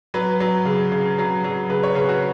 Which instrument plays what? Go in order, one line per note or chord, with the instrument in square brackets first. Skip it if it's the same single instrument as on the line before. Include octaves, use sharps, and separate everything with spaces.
[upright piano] F#3 B4
F#3
C#3
C#3
F#3
F#3
C#3 B4
C#5
C#3 B4
F#4